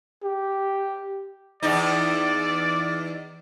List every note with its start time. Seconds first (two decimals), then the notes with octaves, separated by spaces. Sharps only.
0.24 G4
1.63 E2 D#4 D5